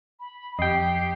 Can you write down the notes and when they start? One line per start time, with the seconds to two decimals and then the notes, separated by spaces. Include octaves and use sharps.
0.20 B5
0.59 F2 G4 D#5 G5 C7